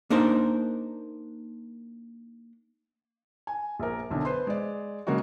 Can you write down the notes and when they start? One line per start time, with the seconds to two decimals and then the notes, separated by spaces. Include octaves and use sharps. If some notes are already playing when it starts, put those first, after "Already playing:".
0.10 A#3 D4 D#4 A#4 C5
3.47 G#5
3.79 A#1 A#4
4.10 B1 D3
4.25 B4 C5 C6
4.47 G#3 D5
5.07 C#3 F#3 G#3 A#3 C#4 F#4